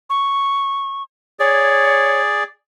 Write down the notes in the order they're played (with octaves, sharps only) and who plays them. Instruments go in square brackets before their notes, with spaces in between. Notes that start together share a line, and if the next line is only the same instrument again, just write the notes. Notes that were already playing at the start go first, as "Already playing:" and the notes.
[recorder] C#6
[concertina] G#4 D5 [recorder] C#5